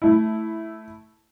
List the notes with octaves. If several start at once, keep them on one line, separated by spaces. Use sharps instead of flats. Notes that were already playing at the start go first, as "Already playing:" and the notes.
A3 E4